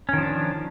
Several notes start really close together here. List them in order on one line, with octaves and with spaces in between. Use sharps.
C#4 D#3 F3 D4